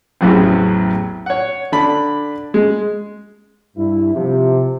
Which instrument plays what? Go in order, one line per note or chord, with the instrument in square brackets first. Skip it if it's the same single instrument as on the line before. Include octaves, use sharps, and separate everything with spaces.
[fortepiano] A1 E2 C#3 F#3 B3 C4
C#5 F#5
D3 D5 B5
G#3
[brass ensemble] G2 E4
C3 F3